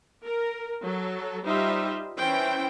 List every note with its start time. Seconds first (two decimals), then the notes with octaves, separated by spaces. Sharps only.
0.24 A#4
0.82 F#3 A4
1.44 G3 D#4 F4 C5 E5
2.18 E3 C#4 C5 E5 G5